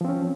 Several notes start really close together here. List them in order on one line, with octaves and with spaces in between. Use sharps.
F3 C4 C#4